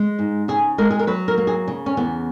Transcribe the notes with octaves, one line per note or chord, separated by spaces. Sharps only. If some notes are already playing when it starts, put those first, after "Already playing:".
Already playing: G#3
G#2
C#3 G#4
G#3 A#4
G#4
A#4
F#3 B4
A#4
A#3
G#4
C#3
C#4
E2 B3